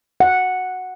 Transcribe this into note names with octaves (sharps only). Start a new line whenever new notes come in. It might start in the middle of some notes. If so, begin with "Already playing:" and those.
F#5